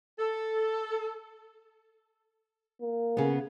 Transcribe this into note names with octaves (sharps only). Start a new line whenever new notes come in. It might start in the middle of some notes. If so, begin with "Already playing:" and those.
A4
A#3
C#3 B3